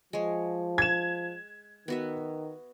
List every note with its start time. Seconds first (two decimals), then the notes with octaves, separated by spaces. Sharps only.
0.13 F3 G#3 C#5
0.78 G#6 E7
1.88 D#3 B3 F#4 E5